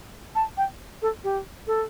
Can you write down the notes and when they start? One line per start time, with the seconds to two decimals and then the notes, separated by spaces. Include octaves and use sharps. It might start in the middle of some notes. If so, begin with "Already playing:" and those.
0.35 A5
0.57 G5
1.02 A4
1.24 G4
1.67 A4